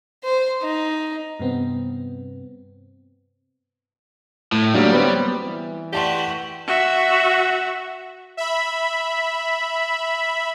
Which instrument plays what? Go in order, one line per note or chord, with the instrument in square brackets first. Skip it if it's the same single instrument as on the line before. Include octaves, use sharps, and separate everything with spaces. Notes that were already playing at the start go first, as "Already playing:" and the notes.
[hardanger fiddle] C5
D#4
[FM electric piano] G2 C3 B3 C4
[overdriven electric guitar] A2
[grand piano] D3 F#3 A#3 [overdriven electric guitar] G3
[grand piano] B3 C4
[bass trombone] E3
[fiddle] A3 F#4 [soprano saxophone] G4 [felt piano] D5 A5 C6
[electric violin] F#4 E5
[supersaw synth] E5 B5